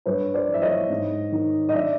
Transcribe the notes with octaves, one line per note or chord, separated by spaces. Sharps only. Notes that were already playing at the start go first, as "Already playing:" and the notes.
G2 B4 C#5
C5 D5
E3
E5
C#5 D#5
G#2
D#3
D#5
D5 E5